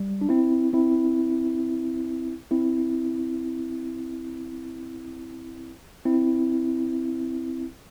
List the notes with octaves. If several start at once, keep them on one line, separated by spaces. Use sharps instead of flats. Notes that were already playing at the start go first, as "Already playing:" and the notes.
Already playing: G3
D4
C4 E4
C4 E4
C4 E4
C4 E4